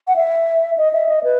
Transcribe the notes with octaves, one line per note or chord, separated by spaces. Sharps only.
F#5
E5
D#5
E5
D#5
B4